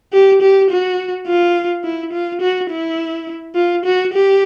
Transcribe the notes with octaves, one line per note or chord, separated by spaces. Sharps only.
G4
G4
F#4
F4
E4
F4
F#4
E4
F4
F#4
G4